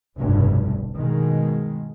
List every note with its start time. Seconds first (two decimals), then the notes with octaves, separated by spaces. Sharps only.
0.18 F1 B1 G2 B2 D3
0.96 B2 D#3 G#3